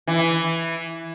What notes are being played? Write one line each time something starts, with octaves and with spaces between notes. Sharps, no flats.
E3